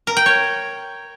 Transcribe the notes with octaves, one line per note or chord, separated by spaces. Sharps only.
A#4
G5
C#5